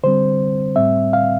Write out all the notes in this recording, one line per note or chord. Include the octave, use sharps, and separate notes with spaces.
D3 G3 C4 C5
A2 G3 C4 E5
F5